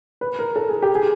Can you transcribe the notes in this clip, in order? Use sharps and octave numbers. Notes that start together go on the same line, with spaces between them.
B4
A#4
A4
G#4
G4
G#4